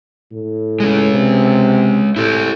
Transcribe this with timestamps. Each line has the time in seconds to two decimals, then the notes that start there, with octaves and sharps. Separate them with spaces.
0.32 A2
0.80 G#3 C#4
1.14 C3
2.16 A2 E4 G4